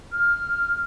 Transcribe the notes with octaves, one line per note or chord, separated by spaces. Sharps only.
F6